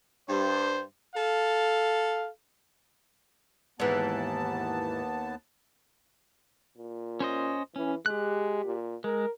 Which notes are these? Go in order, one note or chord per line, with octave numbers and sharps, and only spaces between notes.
G2 C5
A4 F5
D#2 G#2 E3 B3 A5
A#2
C#4 C5 D#5
E3 C#4
G#3 G4 F#6
A#2
G#3 A#4